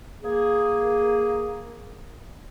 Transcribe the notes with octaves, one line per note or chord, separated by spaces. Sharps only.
A#3 G#4